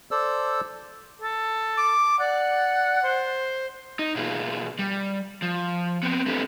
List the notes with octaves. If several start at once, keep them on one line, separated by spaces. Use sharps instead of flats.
A4 C5 D5 E6
A4
D6
D5 F#5
C5
D#4
B2 A#3 F4 G#4
G3
F3
B3 C4
A3 C4 D4 G4 A4 B4